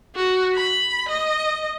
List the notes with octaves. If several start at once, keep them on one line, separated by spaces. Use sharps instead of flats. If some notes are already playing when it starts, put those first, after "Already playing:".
F#4
B5
D#5